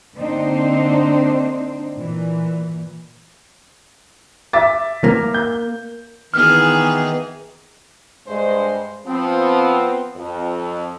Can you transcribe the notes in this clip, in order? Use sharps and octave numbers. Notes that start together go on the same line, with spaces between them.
D3 A#3 C4 D4 D#4 C5
A#2 E3
E5 D6 A6
A#3
G6
D#3 E3 B3 G#4 F6
G2 G#3 C5
F3 B3 C4
F2